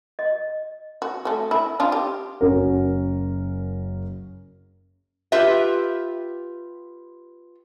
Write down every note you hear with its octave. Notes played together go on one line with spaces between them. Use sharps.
D#5
F#4
A3 F#4
E4
D4 D#4 F4
G4
F#1 C#4 F#4 A#4
F4 G4 B4 E5